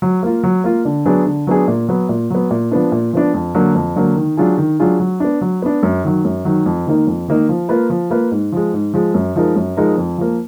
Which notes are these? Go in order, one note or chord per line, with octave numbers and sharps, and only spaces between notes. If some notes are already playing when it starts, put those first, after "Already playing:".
F#3
A#3 F4
F#3
A#3 F4
D3
F#3 B3 D4 G#4
D3
F#3 B3 D4 G#4
A#2
F#3 B3
A#2
F#3 B3
A#2
F3 B3 D4
A#2
F3 B3 D4
F2
D3 F#3 A#3
F2
D3 F#3 A#3
D#3
F#3 D4 F4 G#4
D#3
F#3 D4 F4 G#4
F#3
B3 D4
F#3
B3 D4
F#2
D#3 F#3
F#2
D#3 F#3
F2
D#3 A#3 D#4
F2
D#3 A#3 D#4
F3
A#3 F4 B4
F3
A#3 F4 B4
G#2
F3 G#3
G#2
F3 G#3
F#2
F3 G#3 D#4 A#4
F#2
F3 G#3 D#4 A#4
F2
F3 A#3